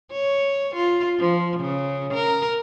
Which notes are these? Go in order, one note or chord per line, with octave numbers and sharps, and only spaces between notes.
C#5
F4
F3
C#3
A#4